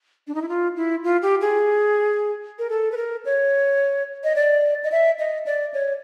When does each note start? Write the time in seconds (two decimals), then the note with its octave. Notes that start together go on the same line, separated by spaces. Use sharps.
0.27 D4
0.35 D#4
0.42 E4
0.49 F4
0.76 E4
1.04 F4
1.22 G4
1.41 G#4
2.59 A#4
2.70 A4
2.92 B4
2.97 A#4
3.25 C#5
4.24 D#5
4.36 D5
4.84 D#5
4.92 E5
5.19 D#5
5.46 D5
5.74 C#5